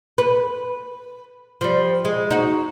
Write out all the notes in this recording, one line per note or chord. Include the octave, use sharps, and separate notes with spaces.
B4
F3 G3
G#3
D#4 F#4